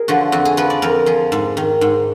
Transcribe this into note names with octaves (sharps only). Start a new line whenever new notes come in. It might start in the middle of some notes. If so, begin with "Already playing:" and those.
Already playing: G#4 A#4
D3 F3 F#4
F2 F#4
G#4
F3 B4
D5
F2 A#4
F3 G#4
G#2
D#3
G#2